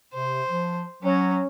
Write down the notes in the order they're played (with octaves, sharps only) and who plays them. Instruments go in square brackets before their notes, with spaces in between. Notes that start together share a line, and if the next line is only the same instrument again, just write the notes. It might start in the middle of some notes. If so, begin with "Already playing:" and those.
[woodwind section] C3 [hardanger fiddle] C5
[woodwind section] F3
[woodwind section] F#3 [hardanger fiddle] C#4